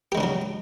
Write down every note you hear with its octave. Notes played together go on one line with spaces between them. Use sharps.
C#3 F#3 G#3 D4 G4